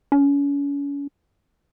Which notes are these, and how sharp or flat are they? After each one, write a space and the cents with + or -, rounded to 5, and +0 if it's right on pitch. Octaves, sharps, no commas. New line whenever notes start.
C#4 +35